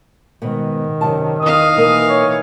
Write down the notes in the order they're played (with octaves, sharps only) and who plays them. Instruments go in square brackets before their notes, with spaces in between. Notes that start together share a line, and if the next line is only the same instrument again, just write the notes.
[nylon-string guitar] G#2 B2 B3 [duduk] D#3
[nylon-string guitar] F#2 C3 A5
[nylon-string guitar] E2 [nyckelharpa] D#4 F5 [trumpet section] D#6
[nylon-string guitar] B2 A#3 A#4 [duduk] E3
[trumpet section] C#5